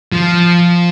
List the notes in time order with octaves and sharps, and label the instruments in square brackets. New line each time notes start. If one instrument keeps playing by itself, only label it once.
[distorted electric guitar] F3